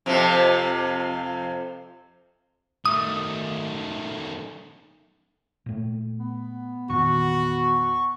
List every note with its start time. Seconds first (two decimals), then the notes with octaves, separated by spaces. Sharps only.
0.06 F2 C3 F3
2.85 D#3 A3 D#6
5.66 A#2 A3
6.19 B3
6.90 E2 A#2 D#3 F#4 C#6